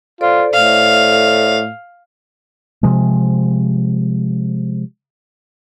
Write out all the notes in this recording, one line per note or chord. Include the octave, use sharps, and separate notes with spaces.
F4 A4 C5 D5
A2 F5
C3 F3 G#3